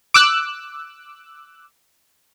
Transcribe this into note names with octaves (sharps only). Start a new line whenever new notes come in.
D6 E6 F#6